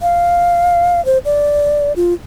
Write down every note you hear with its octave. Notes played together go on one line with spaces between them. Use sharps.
F5
C5
D5
F4